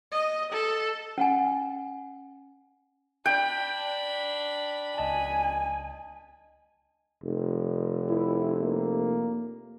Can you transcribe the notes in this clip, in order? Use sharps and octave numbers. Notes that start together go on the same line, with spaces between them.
D#5
A4
C#4 F#5 G#5
D4 G5 B5
C#2 D#5 G#5 A5
F1
E4
A#3